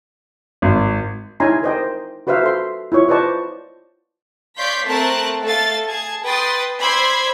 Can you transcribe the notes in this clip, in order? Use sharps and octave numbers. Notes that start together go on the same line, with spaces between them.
G#1
D#4 E4 C#5 G#5 A#5 C6
A#4 C5 D#5 G5
F#4 B4 C5 E5 F5
A4 C6
E4 F4 C#5 C#6
B4 C5 D5 D#5 A5 C#6
C#5 D5 F5 C6 G6 B6
A3 C4 A#4 A5 F#6
A3 A4 F5 A6
G#4 A5 G#6
B4 G5 C6 D#6 A6
C5 D5 B5 C6 E6 G#6